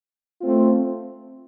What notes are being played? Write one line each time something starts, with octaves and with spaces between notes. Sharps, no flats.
A3 C4 F4